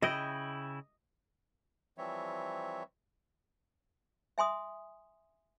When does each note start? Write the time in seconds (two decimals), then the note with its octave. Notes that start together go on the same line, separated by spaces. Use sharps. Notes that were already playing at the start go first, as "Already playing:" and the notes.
0.02 C#3 E4 D#5 G5
1.98 E3 F3 G3 C4 C#5 E5
4.38 E5 G#5 C6 D#6